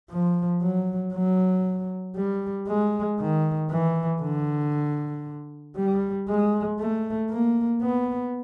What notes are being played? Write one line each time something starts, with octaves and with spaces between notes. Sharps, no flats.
F3
F#3
F#3
G3
G#3
D#3
E3
D3
G3
G#3
A3
A#3
B3